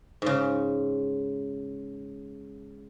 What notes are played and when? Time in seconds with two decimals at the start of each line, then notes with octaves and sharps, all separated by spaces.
0.22 G#2 C#3